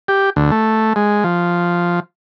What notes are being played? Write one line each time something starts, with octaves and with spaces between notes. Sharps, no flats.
G4
D2
A3
G#3
F3